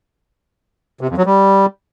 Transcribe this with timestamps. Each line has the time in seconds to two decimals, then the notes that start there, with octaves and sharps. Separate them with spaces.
1.01 C3
1.09 F2
1.17 F#3
1.26 G3